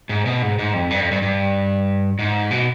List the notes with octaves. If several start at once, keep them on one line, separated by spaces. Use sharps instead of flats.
G#2
B2
G#2
G#2
F2
G2
F2
G2
G2
G#2
B2